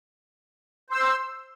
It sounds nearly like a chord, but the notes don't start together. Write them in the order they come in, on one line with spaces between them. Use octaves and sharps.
C5 E6 C6